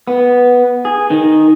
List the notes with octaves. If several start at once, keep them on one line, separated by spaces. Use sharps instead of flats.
B3
G#4
D#3